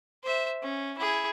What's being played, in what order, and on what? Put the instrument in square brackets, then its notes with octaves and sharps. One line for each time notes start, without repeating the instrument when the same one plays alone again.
[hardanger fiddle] C5 E5
C#4
E4 G#4